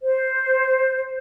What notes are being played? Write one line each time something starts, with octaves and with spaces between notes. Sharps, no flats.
C5